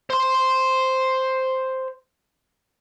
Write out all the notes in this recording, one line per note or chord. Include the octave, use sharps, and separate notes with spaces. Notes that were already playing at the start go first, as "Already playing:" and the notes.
C5 C6